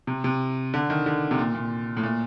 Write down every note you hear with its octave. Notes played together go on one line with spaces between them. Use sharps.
C3
C3
D3
D#3
D3
C3
A#2
A#2
A2
A#2